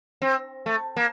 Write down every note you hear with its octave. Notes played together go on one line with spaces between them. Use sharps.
C4
A3
A#3